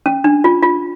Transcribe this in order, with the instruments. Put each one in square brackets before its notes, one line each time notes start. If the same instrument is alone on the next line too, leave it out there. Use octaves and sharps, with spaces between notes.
[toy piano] C#4
D4
F4
F4